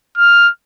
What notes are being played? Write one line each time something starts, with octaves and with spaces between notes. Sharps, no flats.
F6